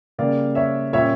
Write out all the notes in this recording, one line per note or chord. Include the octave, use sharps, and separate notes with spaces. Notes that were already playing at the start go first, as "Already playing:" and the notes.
C#3 G3 A#3 D5 F5
C#5 E5
A#2 G3 C#4 C#5 E5